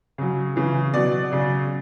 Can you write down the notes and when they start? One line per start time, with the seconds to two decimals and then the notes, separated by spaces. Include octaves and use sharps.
0.18 C#3 F#3
0.56 C#3 E3
0.93 B2 F#3 D5
1.31 C#3 F#3